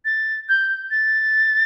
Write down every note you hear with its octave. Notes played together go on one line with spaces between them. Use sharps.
A6
G6
A6